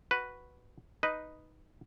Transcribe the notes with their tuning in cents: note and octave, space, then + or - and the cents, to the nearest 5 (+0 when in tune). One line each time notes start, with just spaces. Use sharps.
F#4 +0 B4 +0
D#4 +0 B4 +0 D#5 +0